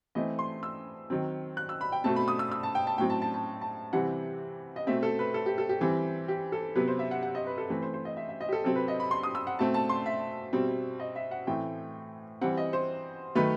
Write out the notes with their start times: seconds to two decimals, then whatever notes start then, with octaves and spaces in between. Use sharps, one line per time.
0.15 E3 A3 C4 D#5
0.39 C6
0.63 E6
1.10 D#3 F#3 C4
1.57 F#6
1.69 E6
1.81 B5
1.92 G5
2.04 B2 A3 C4 A5
2.16 B5
2.28 D#6
2.39 E6
2.52 E6
2.63 A5
2.75 G5
2.87 A5
2.98 A2 F#3 C4 G5
3.10 A5
3.22 A5
3.34 A5
3.61 A5
3.93 C3 E3 G3 C4 F#5
4.76 D#5
4.87 B2 A3 C4 E5
5.03 A4
5.19 B4
5.34 A4
5.46 G4
5.58 A4
5.69 G4
5.81 E3 G3 C4
6.28 G4
6.52 A4
6.75 C3 F#3 B3 B4
6.88 C5
6.99 E5
7.11 F#5
7.23 F#5
7.35 D#5
7.46 B4
7.58 A4
7.70 E3 A3 C4 B4
7.82 C5
7.94 C5
8.05 D#5
8.17 E5
8.29 E5
8.41 D#5
8.49 G4
8.52 A4
8.64 C3 F#3 C4 A4
8.76 B4
8.88 D#5
9.00 B5
9.11 C6
9.23 D#6
9.35 E6
9.47 F#5
9.59 B2 A3 C4 A5
9.74 A5
9.89 C6
10.06 E5
10.53 B2 G3 C4
11.00 D#5
11.16 E5
11.31 F#5
11.47 A2 E3 A3 C4 G5
12.41 E3 G3 C4 F#5
12.57 D#5
12.73 C5
13.35 D#3 F#3 A3 B4